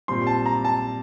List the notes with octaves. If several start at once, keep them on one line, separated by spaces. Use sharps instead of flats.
A#2 G3 C4 C6
A5
A#5
A5